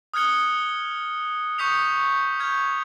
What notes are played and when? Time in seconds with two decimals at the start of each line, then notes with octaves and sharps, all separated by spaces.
0.14 D#6 F6 F#6 G#6 C#7 G7
1.58 C#6 D#6 G6 B6 C#7 F7
2.40 F6 G6 G#6